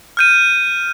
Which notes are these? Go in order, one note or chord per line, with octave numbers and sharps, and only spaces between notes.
F6 G6 D#7